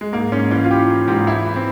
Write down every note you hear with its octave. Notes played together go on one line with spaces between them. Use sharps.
G#3
G#2 A#3
G#2 C#4
E3 C#4
F4
E3 G4
E3
G#2 G4
E3 E4
E3
C4